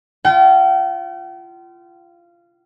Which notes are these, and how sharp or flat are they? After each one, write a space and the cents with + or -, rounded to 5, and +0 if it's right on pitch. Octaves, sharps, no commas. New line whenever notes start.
F4 -20 G5 -45